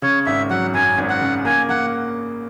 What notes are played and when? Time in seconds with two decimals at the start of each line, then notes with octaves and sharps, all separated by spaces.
0.02 C#3 C#5
0.26 G#1 E5
0.50 F#3 F#5
0.74 F#2 G#5
0.98 G#1
1.10 F#5
1.21 C#3
1.45 A#3 G#5
1.69 A#3 F#5